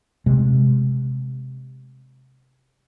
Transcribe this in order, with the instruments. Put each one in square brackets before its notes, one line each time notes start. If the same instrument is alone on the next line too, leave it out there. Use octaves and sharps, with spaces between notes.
[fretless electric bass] C3 G#3